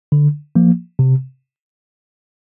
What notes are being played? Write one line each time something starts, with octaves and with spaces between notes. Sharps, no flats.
D3
F3 A#3
C3